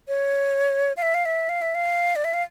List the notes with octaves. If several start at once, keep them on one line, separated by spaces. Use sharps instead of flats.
C#5
F5
E5
F5
E5
F5
E5
F5
D5
E5
F5